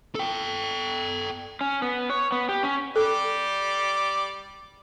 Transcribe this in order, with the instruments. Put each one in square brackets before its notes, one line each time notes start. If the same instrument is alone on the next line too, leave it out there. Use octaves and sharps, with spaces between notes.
[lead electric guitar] A4 G5
[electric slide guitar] C#4
B3
C#5
B3
G4
C#4
[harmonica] G3 G4 D5 [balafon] A4